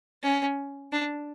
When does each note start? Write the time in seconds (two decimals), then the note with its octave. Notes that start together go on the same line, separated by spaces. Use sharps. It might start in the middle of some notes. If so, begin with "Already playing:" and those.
0.23 C#4
0.92 D4